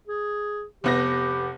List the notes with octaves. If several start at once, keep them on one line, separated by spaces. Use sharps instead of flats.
G#4
F1 B3 G4 A#6